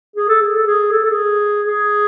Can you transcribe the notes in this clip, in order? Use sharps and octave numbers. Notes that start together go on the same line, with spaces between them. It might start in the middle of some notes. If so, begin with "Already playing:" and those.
G#4
A4
G#4
A4
G#4
A4
A4
G#4
G#4